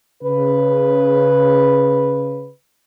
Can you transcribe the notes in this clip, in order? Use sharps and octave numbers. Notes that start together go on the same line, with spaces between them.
C#3 B4